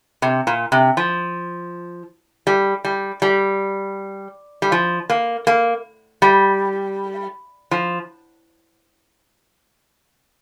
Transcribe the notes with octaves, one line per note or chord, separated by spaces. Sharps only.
C3
A#2
C3
F3
G3
G3
G3
G3
F3
A#3
A#3
G3
F3